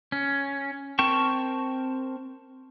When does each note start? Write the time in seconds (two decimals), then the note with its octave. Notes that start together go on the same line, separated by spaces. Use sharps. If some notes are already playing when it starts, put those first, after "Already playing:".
0.12 C#4
0.99 C4 A#4 G5 A5 C#6